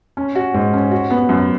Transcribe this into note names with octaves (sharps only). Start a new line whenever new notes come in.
C#4
F#4
G#2
C#4
F#4
B3
F#2